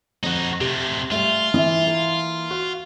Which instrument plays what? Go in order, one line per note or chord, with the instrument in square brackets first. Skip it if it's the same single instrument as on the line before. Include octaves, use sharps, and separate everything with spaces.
[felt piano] F2 [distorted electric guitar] D#4 F#4
[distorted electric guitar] C3 A3 [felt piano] G4
[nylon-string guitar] G3 A3 [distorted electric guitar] F4
[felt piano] E3 [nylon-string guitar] D#5 E5
[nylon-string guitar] A#3
[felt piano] F#4